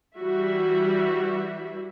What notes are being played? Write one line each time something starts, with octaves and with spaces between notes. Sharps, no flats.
E3 G3 F#4 E5